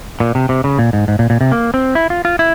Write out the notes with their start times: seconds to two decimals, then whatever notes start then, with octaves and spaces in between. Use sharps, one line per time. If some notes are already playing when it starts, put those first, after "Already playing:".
0.20 A#2
0.35 C3
0.49 C3
0.64 C#3
0.79 A#2
0.93 G#2
1.08 G#2
1.19 A#2
1.30 A#2
1.41 C3
1.52 A#3
1.74 C4
1.95 E4
2.10 F4
2.25 F4
2.39 E4